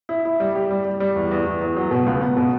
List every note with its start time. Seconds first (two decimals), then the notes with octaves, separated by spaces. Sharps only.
0.09 E4
0.25 E4
0.40 G3
0.55 G4
0.71 G3
0.85 G3
1.00 G3
1.16 E2
1.31 E2
1.46 E2
1.61 E2
1.76 F#3
1.91 B2
2.06 C#2
2.21 B3
2.37 B2